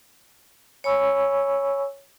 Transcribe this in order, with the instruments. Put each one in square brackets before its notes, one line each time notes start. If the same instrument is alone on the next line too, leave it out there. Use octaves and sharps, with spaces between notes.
[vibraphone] C#5 G#5 B5 C#6 E6